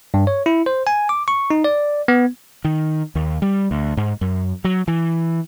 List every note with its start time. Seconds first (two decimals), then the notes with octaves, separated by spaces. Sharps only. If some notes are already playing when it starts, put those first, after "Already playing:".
0.14 G2
0.27 C#5
0.46 E4
0.66 C5
0.87 G#5
1.09 D6
1.28 C#6
1.50 D#4
1.64 D5
2.08 B3
2.65 D#3
3.15 D#2
3.42 G3
3.71 D2
3.97 G#2
4.21 F#2
4.64 F#3
4.88 E3